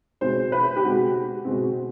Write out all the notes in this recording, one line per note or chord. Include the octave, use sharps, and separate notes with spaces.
B2 G#3 C4 C5
B4
G4
B2 G#3 C4 F#4
B2 G#3 C4